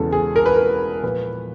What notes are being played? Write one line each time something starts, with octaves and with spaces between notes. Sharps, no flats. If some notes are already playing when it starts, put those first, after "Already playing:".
Already playing: E1 E2 C#3 E3 G#3 A4
G#4
A#4
B4
A#4
A#2 F3 B4